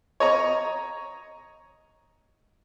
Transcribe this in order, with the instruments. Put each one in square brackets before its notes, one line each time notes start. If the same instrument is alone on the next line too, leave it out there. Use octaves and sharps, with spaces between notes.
[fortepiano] C#5 D#5 A#5